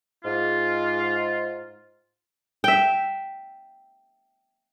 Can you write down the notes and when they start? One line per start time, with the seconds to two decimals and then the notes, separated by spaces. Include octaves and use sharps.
0.25 G#2 F4
2.64 E5 G5